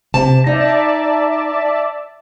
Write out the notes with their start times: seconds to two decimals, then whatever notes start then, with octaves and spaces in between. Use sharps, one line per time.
0.14 C3 A5
0.47 D#4 D5 E5 A5